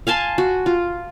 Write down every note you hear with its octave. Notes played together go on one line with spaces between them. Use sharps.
F5 G#5 A5 C6
F#4
F4